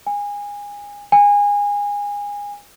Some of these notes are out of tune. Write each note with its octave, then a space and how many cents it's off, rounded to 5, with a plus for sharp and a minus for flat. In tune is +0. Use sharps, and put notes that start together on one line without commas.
G#5 -25
G#5 -25